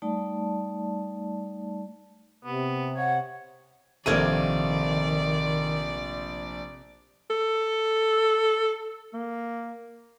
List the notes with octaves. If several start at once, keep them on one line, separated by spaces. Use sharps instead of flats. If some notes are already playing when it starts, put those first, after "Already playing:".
G3 A3 D#4 D5 A5
C3 B3
C#5 F#5
A#1 C3 D#3 A3 A#3 D5 G#6 D#7
A4
A#3